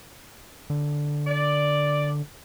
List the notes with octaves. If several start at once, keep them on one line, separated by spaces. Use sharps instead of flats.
D3
D5